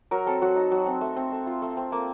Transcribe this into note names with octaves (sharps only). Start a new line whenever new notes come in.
F#3 A#4
C4 A4
F#3 F#4
D#4
F#3
C4
A3
C4
A3
F4
A3
C4
A#3